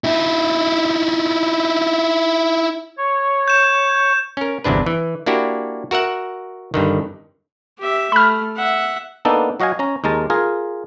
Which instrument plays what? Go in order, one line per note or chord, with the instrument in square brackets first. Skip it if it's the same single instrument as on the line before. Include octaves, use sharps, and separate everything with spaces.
[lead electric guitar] D#4 E4
[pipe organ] C#5
[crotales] G6 E7
[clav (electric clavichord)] C#4 A#4
G1 E2 C3 D4 B4
E3
A#3 D4 E4 F#4 G4
F#4 A#4 E5 F#5
G2 D3 D#3
[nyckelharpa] G4 E5
[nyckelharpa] A3 [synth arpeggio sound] B5 F6
[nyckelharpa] E5 F#5
[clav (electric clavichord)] A#3 B3 D4 D#4 A4
F#3 F#4 D#5 F5 G#5
C#4 A#5
D#2 G#3 A#4 A5
F4 G#4 A#4